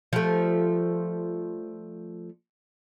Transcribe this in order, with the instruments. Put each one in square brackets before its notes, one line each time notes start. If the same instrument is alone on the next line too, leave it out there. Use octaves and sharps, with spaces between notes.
[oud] F3 G3 A3